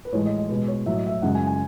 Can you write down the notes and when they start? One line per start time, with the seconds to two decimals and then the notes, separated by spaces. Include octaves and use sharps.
0.05 B4
0.13 A2 E3 G#3 C#5
0.26 D#5
0.37 D#5
0.49 B2 G#3 B4
0.68 C#5
0.86 A2 F#3 E5
0.96 D#5
1.07 E5
1.22 F#2 C#3 G#3 F#5
1.35 G#5
1.47 G#5